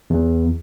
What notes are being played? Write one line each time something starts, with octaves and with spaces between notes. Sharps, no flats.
E2